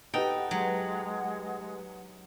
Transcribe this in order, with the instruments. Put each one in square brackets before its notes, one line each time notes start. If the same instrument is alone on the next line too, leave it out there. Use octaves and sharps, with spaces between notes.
[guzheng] D#4 A4 [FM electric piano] G4 B4 F#5 [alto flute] D#5 [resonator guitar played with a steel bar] G5
[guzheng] F#3 [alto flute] G#3